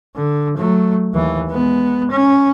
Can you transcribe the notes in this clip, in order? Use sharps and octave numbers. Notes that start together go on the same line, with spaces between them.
D3
F#3 A3
D#2 E3
G#3 B3
C#4